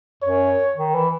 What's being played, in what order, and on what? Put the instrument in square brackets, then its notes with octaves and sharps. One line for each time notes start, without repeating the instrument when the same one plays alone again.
[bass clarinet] F#2 [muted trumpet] C#5
[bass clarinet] D#3
E3